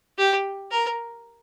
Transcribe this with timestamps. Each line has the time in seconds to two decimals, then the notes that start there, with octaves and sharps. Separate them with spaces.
0.18 G4
0.71 A#4